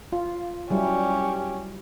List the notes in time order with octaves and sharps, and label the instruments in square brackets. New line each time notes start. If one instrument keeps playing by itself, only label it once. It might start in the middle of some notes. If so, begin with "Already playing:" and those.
[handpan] F4
[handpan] F#3 G3 E4 [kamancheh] C#4 G4